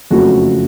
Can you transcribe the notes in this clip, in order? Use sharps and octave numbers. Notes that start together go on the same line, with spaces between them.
F#1 F2 C#3 F#3 A3 F#4